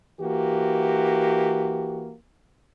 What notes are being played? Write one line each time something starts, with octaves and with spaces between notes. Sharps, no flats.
E3 A#3 F#4 G4